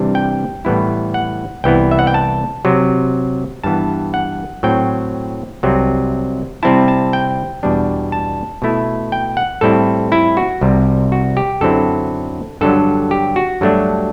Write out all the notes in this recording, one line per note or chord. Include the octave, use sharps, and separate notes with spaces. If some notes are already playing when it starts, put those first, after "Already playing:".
Already playing: C3 E3 G3 D4
G5
A2 E3 G3 B3 E4
F#5
C2 C3 E3 B3 E4 G5
E5
F#5
G5
A5
C3 F#3 C4
G2 E3 B3 A5
F#5
A2 F#3 C4 G5
C2 C3 F#3 C4
C3 G3 C4 E4 A5
A5
G5
E2 B2 G3 D4
A5
B2 A3 E4
G5
F#5
A2 G3 C4 E4 A4
E4
F#4
C2 C3 G3
F#4
G4
F#2 D3 F#3 C4 E4 A4
G2 D3 F#3 A4
G4
F#4
G2 F#3 A3 D4